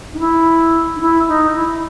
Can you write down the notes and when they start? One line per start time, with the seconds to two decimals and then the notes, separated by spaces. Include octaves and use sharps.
0.14 D#4
0.19 E4
0.96 D#4
1.01 E4
1.28 D#4
1.56 E4